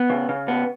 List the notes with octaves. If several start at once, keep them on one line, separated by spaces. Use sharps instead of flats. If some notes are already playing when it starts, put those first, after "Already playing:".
Already playing: B3
C#3
C#3
B3